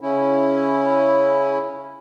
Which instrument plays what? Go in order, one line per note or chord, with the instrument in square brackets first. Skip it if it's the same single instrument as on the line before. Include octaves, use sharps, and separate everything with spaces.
[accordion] C#3 C#4 E4